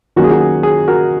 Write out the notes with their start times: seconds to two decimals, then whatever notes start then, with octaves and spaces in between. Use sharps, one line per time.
0.16 D#3 F#3 A#3 C#4 F#4
0.24 G#4
0.31 F#4
0.41 G#4
0.63 G#4
0.88 F#4 A#4